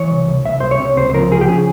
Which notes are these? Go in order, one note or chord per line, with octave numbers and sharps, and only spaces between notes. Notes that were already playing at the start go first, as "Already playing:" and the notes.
Already playing: E3 C#5
C2
C2
C2 E5
C2 C5
C#5
C3
C#2 C5
C5
F3 A#4
F3 G#4
G4
C#3 G#4